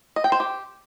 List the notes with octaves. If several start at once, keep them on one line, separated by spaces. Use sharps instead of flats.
D#5
G5
C5
G4